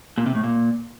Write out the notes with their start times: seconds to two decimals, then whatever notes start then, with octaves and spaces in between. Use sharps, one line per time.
0.18 A#2
0.26 C3
0.35 A2
0.44 A#2